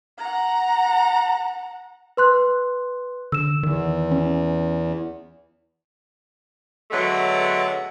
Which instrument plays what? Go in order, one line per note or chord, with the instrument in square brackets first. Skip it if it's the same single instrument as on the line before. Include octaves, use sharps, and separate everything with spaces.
[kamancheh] F#5 A#5
[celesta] B4 C6 F#6
[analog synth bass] D3 [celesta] E6 E7
[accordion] E2 [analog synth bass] D#3
[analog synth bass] C#4
[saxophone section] D3 F#3 G#3 A3 B3